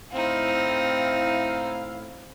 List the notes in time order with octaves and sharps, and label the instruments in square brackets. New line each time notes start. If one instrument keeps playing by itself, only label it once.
[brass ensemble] A2 E4 F5 [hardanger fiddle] C4 D#4